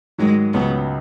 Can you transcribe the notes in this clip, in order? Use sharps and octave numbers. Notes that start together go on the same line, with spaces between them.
G#2 D#3 F#3 G#3
C#2 C#3 F#3 B3